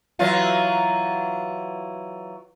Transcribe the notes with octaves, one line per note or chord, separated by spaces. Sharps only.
E3 F#3 F4